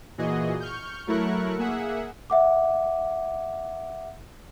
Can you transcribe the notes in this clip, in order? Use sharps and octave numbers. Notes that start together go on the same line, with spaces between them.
A#2 E3 F#4 G#4 D#5
C#6 F6 G6
F#3 A3 E4 A#4 C#6 F#6
A#3 G#4 E5 F#5
E5 F#5 D6